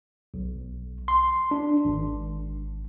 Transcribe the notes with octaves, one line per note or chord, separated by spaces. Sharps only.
B1
C6
D4
G#1